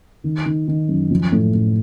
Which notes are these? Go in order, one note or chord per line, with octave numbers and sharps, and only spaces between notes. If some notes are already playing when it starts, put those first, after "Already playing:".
D#3
D#3
D#3
F#2
F3
A2
A2